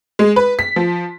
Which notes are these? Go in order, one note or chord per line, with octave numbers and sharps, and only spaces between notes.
G#3
B4
B6
F3